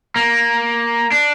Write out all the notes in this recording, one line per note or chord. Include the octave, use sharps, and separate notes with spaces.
A#3
D4